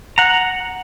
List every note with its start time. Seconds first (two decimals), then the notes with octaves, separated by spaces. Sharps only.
0.18 F#5 A#5